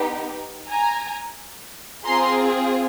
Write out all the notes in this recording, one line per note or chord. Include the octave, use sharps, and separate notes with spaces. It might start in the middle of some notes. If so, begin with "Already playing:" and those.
Already playing: B3 D#4 G4
G#5 A#5
C4 F4 G#4 A#5 C6